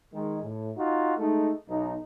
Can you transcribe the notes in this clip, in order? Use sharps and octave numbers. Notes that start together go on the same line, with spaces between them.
D#3 G#3
A2
D#4 F4 F#4
G#3 A3 D#4
B1 D#4